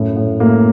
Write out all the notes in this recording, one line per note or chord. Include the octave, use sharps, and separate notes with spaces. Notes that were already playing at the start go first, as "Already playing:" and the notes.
Already playing: F#2 A2
A2
A2 A#3